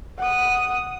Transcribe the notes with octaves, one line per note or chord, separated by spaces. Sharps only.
F#5 D#6